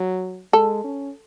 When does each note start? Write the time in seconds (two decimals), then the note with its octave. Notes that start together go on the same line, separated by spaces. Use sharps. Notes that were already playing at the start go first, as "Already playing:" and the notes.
Already playing: F#3
0.53 G#3 A4
0.84 C#4